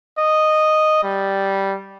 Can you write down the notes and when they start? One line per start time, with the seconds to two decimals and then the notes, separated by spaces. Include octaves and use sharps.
0.19 D#5
1.04 G3